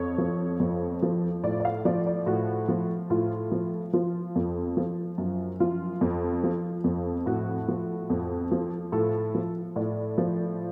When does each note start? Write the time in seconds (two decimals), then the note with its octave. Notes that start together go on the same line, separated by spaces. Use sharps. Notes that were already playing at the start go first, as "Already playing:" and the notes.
Already playing: F2 C#5
0.18 F3
0.60 F2
1.03 F3
1.44 A2 D5
1.60 D5
1.65 F5
1.85 F3 D5
2.07 D5
2.26 A2 F#4
2.68 F3
3.10 A2 F4
3.52 F3
3.93 F3 F4
4.36 F2
4.77 F3
5.18 F#2
5.60 F3 F4
6.01 F2
6.44 F3
6.84 F2
7.26 A2 F#4
7.68 F3
8.10 F2
8.52 F3
8.92 A2 A4
9.35 F3
9.76 A2 D5
10.18 F3